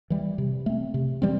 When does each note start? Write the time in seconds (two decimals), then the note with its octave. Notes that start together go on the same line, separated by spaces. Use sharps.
0.10 E3 G3
0.38 C3
0.66 A3 C4
0.94 C3
1.22 E3 G3 C4